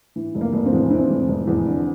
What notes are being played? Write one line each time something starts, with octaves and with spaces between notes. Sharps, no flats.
E3
F1
A#3
F1
C4
E2
E3 C4
F1
F1
E2
D3